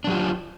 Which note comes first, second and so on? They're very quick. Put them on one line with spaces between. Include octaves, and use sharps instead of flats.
D4 F#3 G4 F4